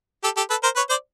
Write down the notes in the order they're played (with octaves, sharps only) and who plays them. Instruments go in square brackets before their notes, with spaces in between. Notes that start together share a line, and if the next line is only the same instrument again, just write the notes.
[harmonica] G4 A4
G4 A4
A4 B4
A#4 C5
B4 C#5
C5 D5